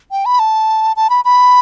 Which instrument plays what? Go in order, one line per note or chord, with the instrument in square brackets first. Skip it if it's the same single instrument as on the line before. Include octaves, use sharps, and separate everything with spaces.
[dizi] G5
B5
A5
A5
B5
B5